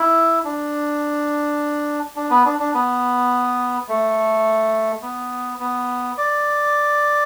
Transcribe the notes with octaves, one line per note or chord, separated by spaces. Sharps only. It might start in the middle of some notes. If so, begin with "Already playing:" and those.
Already playing: E4
D4
D4
B3
D4
D4
B3
A3
B3
B3
D5